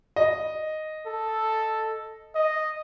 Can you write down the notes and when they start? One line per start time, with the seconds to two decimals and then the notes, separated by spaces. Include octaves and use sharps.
0.16 D#5
1.06 A4
2.35 D#5